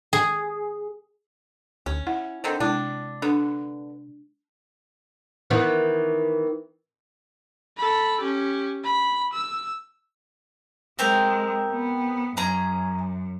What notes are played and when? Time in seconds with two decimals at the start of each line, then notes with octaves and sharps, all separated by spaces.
0.13 G#4
1.86 D2 C#4
2.07 E4 F#5
2.44 D3 D#3 C4
2.60 C3 G#3 D4 E4
3.22 D3 B3 D4
5.50 D#3 E3 B3
7.77 A4 B5
8.21 C#4 G4
8.84 B5
9.33 E6
10.99 G#3 C4 G4 A#4
11.70 B3
12.37 F#2 C#4 G#4 A#5